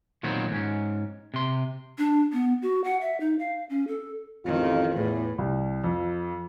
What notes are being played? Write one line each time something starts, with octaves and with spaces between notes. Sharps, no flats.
A#2 D#3 F#3 B3 C4
G#2 C#4
C3 C6
D4
B3
F#4
F#5
E5
D#4
F5
C#4
A4
A1 F2 D#3 F4
E2 A2
C2
F2